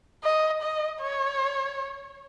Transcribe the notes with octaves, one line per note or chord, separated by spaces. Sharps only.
D#5
D#5
C#5